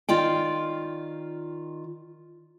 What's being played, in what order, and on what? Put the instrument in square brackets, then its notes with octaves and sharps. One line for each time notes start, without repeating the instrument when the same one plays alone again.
[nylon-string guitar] D#3 F4 D5 G5